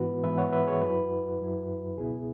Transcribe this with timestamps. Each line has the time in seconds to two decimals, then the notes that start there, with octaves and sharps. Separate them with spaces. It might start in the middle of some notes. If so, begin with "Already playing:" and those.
Already playing: G#2 E3 B3 E4 F#4 B4
0.23 G#2 E3 B3 E4 B4 E5
0.38 C#5 F#5
0.52 B4 E5
0.67 G#4 C#5
0.81 F#2 F#3 E4 F#4 B4
1.39 F#2 F#3 E4
1.98 C#2 B2 B3 E4 G#4